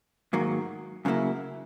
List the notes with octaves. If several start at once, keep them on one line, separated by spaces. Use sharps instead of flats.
G#2 D#3 F#3 A#3
F#2 C#3 F#3 A#3 E4